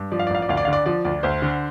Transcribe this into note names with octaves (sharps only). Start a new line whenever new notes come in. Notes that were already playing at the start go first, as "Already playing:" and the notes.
Already playing: G2
F3 D5
F5
D5
A1 F5
D5
D2 F5
D5
D3 F5
D5
F3 D5
D2 D5
D2 C5
D3